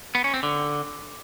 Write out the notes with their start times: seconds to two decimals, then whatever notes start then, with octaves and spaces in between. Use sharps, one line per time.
0.15 B3
0.24 C#4
0.34 C4
0.43 D3